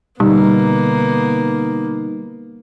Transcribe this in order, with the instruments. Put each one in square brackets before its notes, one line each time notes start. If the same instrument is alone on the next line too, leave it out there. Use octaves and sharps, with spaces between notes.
[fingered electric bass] B2 D3 [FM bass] G3 [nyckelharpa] A#3 B3 [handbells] D#4